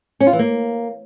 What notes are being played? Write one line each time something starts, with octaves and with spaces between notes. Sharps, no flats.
C#4
F4
E3
A#3